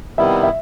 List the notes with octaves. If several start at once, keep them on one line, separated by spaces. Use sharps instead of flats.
C3 D#3 G3 B3 E4 E5
E5